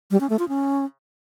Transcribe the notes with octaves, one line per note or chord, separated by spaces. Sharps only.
G3
C#4
A3
F4
C#4